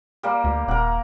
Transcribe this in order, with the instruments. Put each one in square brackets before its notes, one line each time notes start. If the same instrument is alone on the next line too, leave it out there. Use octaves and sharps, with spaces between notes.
[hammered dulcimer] G3 A#3
[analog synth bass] D2
[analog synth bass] D#1 [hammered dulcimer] A#4 F#5